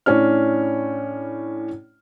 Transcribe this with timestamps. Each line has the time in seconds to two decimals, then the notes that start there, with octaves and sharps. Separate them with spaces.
0.06 A2 C#4 D4 F6